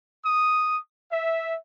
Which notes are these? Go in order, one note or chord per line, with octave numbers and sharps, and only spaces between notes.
D#6
E5